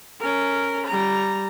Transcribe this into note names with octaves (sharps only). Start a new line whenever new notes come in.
C#4 A#4
G3 A#5